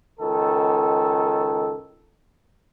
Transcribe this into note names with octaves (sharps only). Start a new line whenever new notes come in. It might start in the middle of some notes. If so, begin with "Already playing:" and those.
C#2 D#3 A4